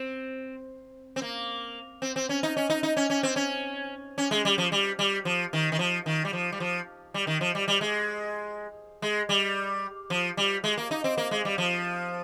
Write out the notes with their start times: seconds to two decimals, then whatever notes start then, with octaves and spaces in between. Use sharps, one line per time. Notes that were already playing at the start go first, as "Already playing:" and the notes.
Already playing: C4
1.16 C4
1.22 A#3
2.02 C4
2.16 C4
2.29 C#4
2.43 D#4
2.57 C#4
2.70 D#4
2.83 D#4
2.97 C#4
3.10 C#4
3.23 C4
3.36 C#4
4.18 C#4
4.31 G#3
4.45 G3
4.58 F3
4.72 G3
4.99 G3
5.25 F3
5.53 D#3
5.72 D#3
5.79 F3
6.06 D#3
6.25 G3
6.33 F3
6.52 G3
6.60 F3
7.14 G3
7.27 D#3
7.41 F3
7.55 G3
7.68 G3
7.81 G#3
9.02 G#3
9.29 G3
10.10 F3
10.37 G3
10.64 G#3
10.77 A#3
10.91 D#4
11.04 C4
11.18 A#3
11.31 G#3
11.45 G3
11.58 F3